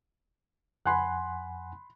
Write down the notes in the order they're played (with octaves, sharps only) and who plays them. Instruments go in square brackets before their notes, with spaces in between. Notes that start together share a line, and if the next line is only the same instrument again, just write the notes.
[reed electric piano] F2 F#5 G#5 [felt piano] B5 C6 F#6